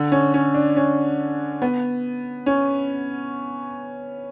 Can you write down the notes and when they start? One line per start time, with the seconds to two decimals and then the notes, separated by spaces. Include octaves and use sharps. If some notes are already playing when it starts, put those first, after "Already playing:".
Already playing: D3
0.12 C#4
0.34 C#4
0.54 D4
0.76 C#4
1.62 B3
2.46 C#4